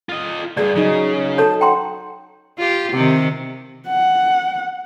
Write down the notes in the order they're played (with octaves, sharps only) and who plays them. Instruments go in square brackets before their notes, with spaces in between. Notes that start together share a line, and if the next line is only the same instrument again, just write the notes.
[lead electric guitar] F4 D#5
[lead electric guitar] D2 G2 [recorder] G#4 [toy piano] D5
[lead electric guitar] C#3 [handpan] F#3 D#4
[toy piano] A4 C#5 [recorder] A5
[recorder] F#5 [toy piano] G5 A#5 C6
[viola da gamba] F4 G4
C3 D#3
[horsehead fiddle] F#5